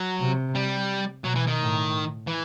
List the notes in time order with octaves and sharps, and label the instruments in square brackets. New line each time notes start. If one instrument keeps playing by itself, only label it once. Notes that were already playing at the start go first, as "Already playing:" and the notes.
Already playing: [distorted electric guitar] F#3
[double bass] C3
[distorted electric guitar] G3
[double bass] B2 [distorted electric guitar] F#3
[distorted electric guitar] E3
D#3
[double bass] A2
[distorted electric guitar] E3